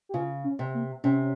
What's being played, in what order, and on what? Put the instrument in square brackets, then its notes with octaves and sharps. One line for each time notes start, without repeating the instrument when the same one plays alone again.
[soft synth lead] G4
[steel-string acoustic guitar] C#3 [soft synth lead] F4
[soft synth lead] C#4
[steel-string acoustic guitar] C3
[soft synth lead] A#3
[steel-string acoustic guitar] C3 [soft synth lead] C#4